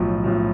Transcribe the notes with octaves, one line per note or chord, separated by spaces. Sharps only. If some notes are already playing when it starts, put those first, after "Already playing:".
Already playing: B1 A2 F3
B1 A2 F3